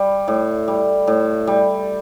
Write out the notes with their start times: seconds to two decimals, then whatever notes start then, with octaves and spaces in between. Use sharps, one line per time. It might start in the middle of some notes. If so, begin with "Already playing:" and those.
Already playing: G3
0.28 A2
0.68 G3
1.07 A2
1.47 G3